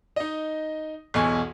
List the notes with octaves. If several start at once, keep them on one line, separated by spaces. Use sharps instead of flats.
D#4 D#5
B1 E2 G#5 C#6